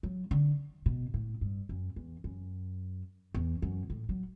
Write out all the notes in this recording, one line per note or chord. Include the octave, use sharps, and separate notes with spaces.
F#3
D3
B2
A2
G2
F#2
E2
F#2
E2
F#2
A2
F#3